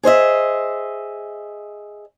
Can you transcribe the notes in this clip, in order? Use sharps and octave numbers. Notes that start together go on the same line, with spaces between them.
G#4 C5 D#5 E5